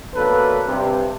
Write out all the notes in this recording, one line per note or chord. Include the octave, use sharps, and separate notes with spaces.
D2 B2 F#3 A#3 A4 B4
G2 C3